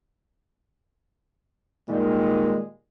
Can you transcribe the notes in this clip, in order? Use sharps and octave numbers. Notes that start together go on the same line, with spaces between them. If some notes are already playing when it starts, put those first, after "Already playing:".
A#2 D#3 G3 G#3